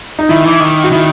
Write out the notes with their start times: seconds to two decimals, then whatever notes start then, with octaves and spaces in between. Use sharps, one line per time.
0.19 D#4
0.29 D#3 E4
0.45 E3
0.60 D#3
0.84 F#4
0.91 D#3 E4